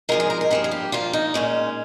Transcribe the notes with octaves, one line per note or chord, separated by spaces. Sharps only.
G#2 F3 G#3 A#4
G#4
A#4
A#4
G2 F3 A#3 G#4
G#4
G4
A#2 F3 A#3 F4
D#4
A#2 G#3 C#4